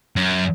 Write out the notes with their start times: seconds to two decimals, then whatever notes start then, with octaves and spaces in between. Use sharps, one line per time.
0.16 F#2